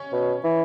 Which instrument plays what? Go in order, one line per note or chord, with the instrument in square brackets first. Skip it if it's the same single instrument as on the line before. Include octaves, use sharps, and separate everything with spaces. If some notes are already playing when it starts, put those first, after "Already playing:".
Already playing: [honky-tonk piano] C#4
[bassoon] B2
E3